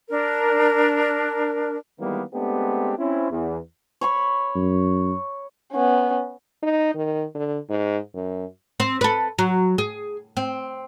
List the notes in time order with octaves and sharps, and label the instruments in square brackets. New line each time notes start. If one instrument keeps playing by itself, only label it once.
[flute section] D4 A#4
[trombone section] D#3 E3 G3 G#3 A#3 B3
G#3 A3 B3 C4 D4 G4
C4 C#4 E4
E2
[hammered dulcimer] C#5 B5 C#6
[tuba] F#2
[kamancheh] B3 C#4
[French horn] D#4
D#3
D3
G#2
F#2
[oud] C4
A4 B4
F#3
G#4
C4